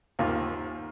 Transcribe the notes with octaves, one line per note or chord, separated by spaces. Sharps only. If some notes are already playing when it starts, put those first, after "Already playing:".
D#2 D#3 A#3 F4